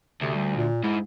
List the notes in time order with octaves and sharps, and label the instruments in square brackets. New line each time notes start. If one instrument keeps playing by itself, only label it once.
[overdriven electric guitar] D2 [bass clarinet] C3
[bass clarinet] G3
A#2
[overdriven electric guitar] G#2 [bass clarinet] E4